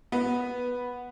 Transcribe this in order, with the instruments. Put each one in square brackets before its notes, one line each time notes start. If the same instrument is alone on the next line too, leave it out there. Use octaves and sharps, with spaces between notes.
[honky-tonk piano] B3